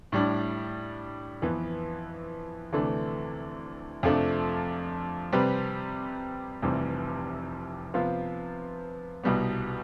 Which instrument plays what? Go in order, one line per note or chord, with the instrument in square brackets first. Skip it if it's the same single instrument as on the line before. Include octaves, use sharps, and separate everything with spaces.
[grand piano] A2 G3 D4
F2 E3 B3
D2 C3 E3 A3 D4
F2 C3 F3 A3 D4
C3 G3 C4 G4 B4
F1 F2 C3 E3 G3
C3 F3 B3 F4
C2 B2 G3 B3